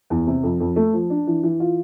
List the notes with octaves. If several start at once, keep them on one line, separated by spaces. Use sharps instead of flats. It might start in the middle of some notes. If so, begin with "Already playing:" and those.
E2
C3
F2
F2
A3
F3
D4
E3
E3
F4